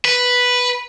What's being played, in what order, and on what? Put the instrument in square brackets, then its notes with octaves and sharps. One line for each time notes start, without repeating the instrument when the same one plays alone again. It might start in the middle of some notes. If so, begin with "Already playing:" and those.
[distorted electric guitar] B4